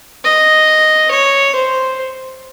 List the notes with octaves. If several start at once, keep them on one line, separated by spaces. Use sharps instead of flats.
D#5
C#5
C5